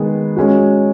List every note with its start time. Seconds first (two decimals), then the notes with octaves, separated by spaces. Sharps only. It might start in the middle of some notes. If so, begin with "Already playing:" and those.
Already playing: D#3 G#3 B3 G#4
0.36 G#3 C#4 F#4